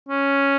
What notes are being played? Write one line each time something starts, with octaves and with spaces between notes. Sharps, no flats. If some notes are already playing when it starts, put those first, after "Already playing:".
C#4